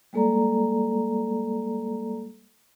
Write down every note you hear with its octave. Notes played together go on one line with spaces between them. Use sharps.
G3 G#3 A#3 A4 D5 A#5